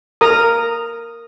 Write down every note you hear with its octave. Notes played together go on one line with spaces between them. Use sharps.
A#4 A#5 D#6